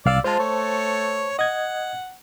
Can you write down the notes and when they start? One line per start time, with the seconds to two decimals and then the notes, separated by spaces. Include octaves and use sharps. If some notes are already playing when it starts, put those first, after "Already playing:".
0.06 C2 D5 F5 E6
0.24 G#3 F4 C5 A5
0.39 A3 C#5
1.39 D#5 F#5 G#6